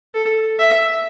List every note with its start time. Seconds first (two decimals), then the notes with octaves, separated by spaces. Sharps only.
0.14 A4
0.59 E5